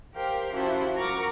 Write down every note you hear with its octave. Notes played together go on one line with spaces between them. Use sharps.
G4 A#4 C5 F5 G5
F3 C#4 E4 F#4 G4
A#4 F#5 A#5 C#6 D6 F6